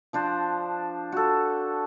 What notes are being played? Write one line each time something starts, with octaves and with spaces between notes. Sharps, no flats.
F3 D4 C5
F#4 A4